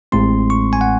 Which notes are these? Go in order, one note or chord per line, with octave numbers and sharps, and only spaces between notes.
A1 A2 G#3 C4 C6
C#6
G#5
F#5